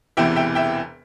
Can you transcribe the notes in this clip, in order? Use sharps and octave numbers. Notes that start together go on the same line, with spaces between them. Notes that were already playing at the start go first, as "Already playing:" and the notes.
E1 E2 C3 E3 E5 G5
E5 G5
E5 G5